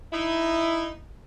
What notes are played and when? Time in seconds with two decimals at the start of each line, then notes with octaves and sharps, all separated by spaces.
0.13 D#4 E4